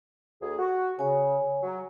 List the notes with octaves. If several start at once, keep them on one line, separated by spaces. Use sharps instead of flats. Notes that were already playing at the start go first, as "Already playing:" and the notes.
D2 G#4
F#4
C#3 C#5 G#5
F#3